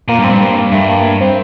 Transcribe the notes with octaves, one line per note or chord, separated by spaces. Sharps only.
A#2 A#3
G2
C4
G2
A#3
G2 A3
A#3
C4